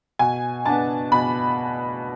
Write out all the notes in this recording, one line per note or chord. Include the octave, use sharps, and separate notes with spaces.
B2 G#5
B3 D4 A5
B2 B5